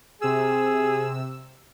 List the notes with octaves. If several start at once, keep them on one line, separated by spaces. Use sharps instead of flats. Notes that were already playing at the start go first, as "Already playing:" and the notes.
C3 G#4 E6